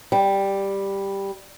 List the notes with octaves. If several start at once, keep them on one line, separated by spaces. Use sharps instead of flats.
G3